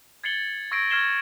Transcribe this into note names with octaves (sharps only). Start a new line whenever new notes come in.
G#6 A6 C7 C#7 F#7 G7
C#6 E6 G#6 A#6 C7 D7
C#6 F6 G#6 C7 E7 G7